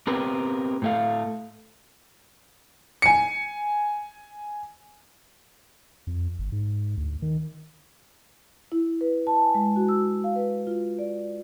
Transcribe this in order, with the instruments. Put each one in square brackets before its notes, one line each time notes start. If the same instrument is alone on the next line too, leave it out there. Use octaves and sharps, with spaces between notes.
[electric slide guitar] B3 C4 G4 A#4 B4
A2 A3 F5
[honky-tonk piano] G#5 C#7
[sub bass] F2
G1
G#2
D2
D#3
[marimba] E4
B4
A5
G#5
G#3
F#4
E6
F5
B4
F4
D5